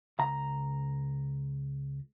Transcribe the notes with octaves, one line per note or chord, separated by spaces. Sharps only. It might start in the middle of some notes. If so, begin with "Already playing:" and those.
C#2 A#5